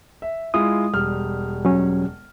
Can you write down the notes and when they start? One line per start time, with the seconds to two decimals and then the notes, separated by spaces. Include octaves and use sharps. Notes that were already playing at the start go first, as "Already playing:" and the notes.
0.22 E5
0.54 G#3 E4 F4 D#6
0.93 E1 G3 F6
1.65 F#3 C#4